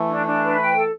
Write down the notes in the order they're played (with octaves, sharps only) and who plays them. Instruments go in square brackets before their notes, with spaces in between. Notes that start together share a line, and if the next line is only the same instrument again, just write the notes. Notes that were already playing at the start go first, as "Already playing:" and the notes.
Already playing: [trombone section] E3 A3
[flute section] D4
D4
B4
G5
A4